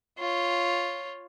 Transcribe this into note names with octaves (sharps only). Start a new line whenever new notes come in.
F4 C#5